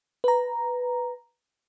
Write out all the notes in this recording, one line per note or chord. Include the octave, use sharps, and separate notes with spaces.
B4 A#5